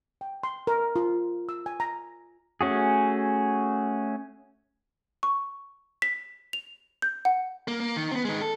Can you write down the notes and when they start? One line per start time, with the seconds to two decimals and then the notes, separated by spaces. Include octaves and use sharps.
0.21 G5
0.43 C6
0.67 A#4
0.96 F4
1.49 E6
1.66 G#5
1.80 A#5
2.61 A3 C#4 F#4 G#4
5.23 C#6
6.02 B6
6.53 F7
7.02 G6
7.25 F#5
7.68 A#3
7.80 A#3
7.96 D#3
8.12 B3 C4
8.25 D#3 G#3
8.42 A4